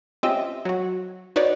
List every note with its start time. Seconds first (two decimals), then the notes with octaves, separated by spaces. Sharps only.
0.23 C4 C#4 F4 G4 D#5 E5
0.65 F#3 F#4
1.36 D#4 F#4 B4 C#5 D5